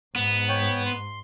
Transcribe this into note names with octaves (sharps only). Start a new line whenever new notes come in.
G#2 B3
C#5 G5
C6